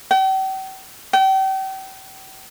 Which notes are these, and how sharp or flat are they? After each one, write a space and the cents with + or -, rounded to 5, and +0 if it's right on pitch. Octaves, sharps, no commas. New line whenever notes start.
G5 -45
G5 -35